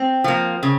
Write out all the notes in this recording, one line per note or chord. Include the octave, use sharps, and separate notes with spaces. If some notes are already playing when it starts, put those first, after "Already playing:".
Already playing: C4
F3 A#3
C#3